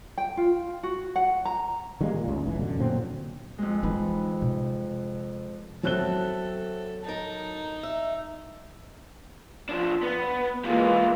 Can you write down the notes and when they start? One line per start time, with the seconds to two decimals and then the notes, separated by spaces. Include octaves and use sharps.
0.18 G5
0.37 F4
0.83 F#4
1.16 F#5
1.45 A#5
2.01 D#3 G3 G#3 A#3
2.14 A#2
2.28 C#2 G#2
2.46 F1 E3
2.59 F#2 B2 D3
2.79 A#2 D3 F#3 C4
3.58 F2 G#3
3.83 E3 D#4 B4
4.42 C3
5.83 F#3 B3 C4 A4 E5 F#6 G7
7.04 D#4 A#4 A5
7.83 E5
9.69 F3 D4
10.03 B3
10.64 E3 G#3 A#3 B3 F4